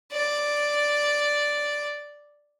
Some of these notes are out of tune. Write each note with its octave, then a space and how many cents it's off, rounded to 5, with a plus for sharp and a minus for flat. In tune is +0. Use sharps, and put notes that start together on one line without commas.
D5 +0